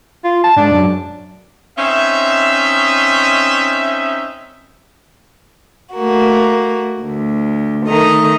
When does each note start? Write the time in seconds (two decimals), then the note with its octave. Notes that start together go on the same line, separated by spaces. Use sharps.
0.24 F4
0.44 A5
0.56 G#2 D4
0.71 F#2
1.78 C4 C#4 D#4 D#5 E5
5.94 A3 A#3 F#4
7.00 D2
7.86 D#3 A3 D#5 A#5